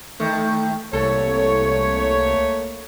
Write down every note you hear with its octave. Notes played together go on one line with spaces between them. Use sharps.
D#2 D#3 A3
C2 A3 A#3 A4 C#5